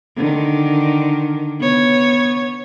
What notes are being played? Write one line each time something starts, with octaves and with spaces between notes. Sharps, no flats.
D3 D#3
B3 C#5